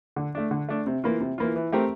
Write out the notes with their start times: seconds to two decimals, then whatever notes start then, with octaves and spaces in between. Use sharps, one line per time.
0.16 D3
0.35 A3 D4
0.51 D3
0.69 A3 D4
0.87 C3
1.04 E3 A#3 F4
1.21 C3
1.38 E3 A#3 F4
1.56 E3
1.72 A3 C4 G4 A#4